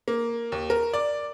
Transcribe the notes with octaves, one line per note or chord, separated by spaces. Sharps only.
A#3
D#2
A#4
D5